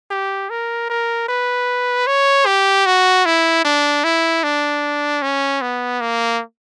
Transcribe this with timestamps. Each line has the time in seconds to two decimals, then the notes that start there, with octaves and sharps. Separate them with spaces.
0.10 G4
0.50 A#4
0.90 A#4
1.28 B4
2.07 C#5
2.46 G4
2.86 F#4
3.25 E4
3.65 D4
4.04 E4
4.43 D4
5.22 C#4
5.61 B3
6.01 A#3